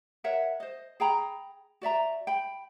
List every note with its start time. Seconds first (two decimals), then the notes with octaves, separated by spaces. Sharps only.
0.24 A#4 C#5 E5 F#5
0.60 C5 D#5
1.00 G#4 G5 A#5 B5
1.82 F#4 D5 E5 A#5
2.27 G5 B5